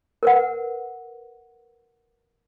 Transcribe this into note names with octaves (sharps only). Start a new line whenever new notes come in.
A#4 B4 F#5